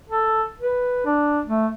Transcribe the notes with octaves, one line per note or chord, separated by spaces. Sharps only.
A4
B4
D4
A3